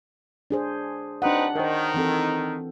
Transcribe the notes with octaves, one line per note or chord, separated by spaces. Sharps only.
D4 G#4 C5
C4 D4 D#4 B4 F#5
D#3 A#4 C5
E3 C4 A4